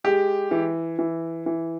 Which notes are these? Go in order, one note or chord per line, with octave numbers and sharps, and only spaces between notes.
G#3 G4
E3
E3
E3